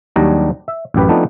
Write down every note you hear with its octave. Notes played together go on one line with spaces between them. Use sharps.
D#2 F#3 G3 D4 D#4 A#5
E5
A1 F#2 G4 B4
F3 A3 B3 C4 D4 D#4